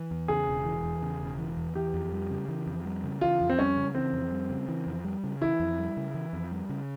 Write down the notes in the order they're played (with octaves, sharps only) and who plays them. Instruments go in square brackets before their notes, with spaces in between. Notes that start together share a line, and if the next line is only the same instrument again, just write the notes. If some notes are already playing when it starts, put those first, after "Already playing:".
Already playing: [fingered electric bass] E3
E2
[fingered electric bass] C#3 [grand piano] G#4
[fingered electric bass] E1
E3
E2
C#3
E1
E3
E2
[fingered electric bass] E3 [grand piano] G4
[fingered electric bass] F2
G3
C#3
E3
F2
G3
C#3
[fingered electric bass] E3 [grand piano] F4
[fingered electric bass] F2
[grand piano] C4
[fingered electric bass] G3 [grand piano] C#4
[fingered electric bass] C#3
[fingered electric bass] E3 [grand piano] C4
[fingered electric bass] F2
G3
C#3
E3
F2
G3
C#3
[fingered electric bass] E3 [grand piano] E4
[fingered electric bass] F2
G3
C#3
E3
F2
G3
C#3